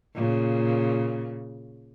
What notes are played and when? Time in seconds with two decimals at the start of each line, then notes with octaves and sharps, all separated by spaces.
0.15 A#2 C#3